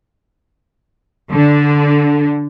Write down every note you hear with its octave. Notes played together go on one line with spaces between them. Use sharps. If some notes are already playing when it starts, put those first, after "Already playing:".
D3